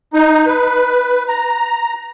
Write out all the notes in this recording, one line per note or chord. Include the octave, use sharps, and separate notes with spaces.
D#4
B4
A#5